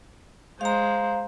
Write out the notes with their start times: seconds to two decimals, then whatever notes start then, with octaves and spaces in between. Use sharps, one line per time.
0.61 G#3 C5 F5 A#5